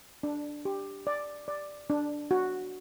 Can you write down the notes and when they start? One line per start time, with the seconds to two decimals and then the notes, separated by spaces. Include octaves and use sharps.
0.23 D4
0.65 G4
1.07 D5
1.48 D5
1.90 D4
2.31 F#4